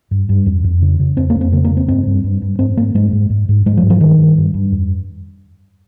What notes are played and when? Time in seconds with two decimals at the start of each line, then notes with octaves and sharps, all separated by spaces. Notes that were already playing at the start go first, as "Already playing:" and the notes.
0.11 G2
0.29 G2
0.46 F2
0.64 F2
0.82 C#3
1.00 C#3
1.17 F2 C4
1.30 A#3
1.36 F2
1.41 C4
1.52 C#3 A#3
1.64 A#3
1.71 C#3
1.77 C4
1.88 G2 C4
2.07 G2
2.24 G2
2.42 G2
2.59 G#2 C4
2.77 G#2 A#3
2.94 G#2 G#3
3.13 G#2
3.30 G#2
3.49 G#2
3.66 G#2 G#3
3.77 F3
3.83 G#2
3.90 F3
4.01 G2 D#3
4.20 G2
4.37 G2
4.54 G2
4.72 F2